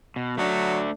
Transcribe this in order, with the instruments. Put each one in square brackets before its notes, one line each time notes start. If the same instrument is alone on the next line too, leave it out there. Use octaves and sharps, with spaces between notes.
[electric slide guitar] B2
[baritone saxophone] F#3 [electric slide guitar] A3 D4